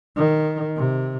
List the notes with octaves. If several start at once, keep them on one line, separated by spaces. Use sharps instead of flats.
D#3
C3